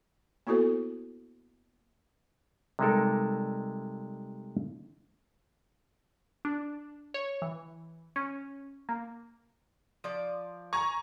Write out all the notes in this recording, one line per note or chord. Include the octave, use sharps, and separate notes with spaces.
A#3 B3 E4 F#4 A4 C5
C3 G3 G#3 D#4 A4 A#4
D4
C#5
E3
C#4
A#3
F3 D5
G#5 A#5 C#6